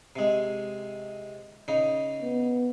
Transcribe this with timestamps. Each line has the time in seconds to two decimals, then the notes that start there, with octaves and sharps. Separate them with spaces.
0.16 C3 G#3
1.68 C#3 D#4
2.22 B3